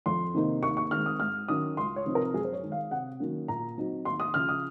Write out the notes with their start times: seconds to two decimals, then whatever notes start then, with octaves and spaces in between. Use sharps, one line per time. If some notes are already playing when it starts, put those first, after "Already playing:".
0.06 F2 C6
0.35 C3 D#3 A#3 D#4
0.63 D#2 C#6
0.77 C#6
0.91 D#3 G#3 C4 F6
1.06 D#6
1.20 G#2 F6
1.48 D#3 F#3 C#4 D#6
1.77 C#2 C6
1.96 C#5
2.05 C3 F3 C4 D#4
2.15 A#4
2.34 F#2 G#4
2.45 C5
2.53 C#5
2.63 D#3 G#3
2.72 F5
2.91 C3 F#5
3.20 D#3 F#3 A#3 C#4
3.48 A#2 A#5
3.78 F#3 C4 D#4
4.05 D#2 C6
4.20 D#6
4.34 C#3 F3 F6
4.49 D#6